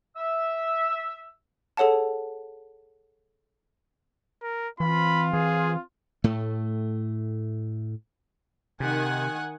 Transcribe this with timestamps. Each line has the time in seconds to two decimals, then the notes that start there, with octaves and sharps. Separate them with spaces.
0.17 E5 E6
1.77 G#4 A4 C#5 F#5 A5
4.42 A#4
4.80 E3 C4 F4 B5
5.33 E3 G#4
6.24 A2 A3
8.80 C3 D#3 F#5 G#5